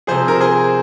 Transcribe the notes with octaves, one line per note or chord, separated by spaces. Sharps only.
C3 F3 G#4 C5
A#4
G#4 C5